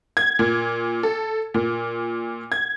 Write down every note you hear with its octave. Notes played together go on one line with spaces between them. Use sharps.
G#6
A#2
A4
A#2
G#6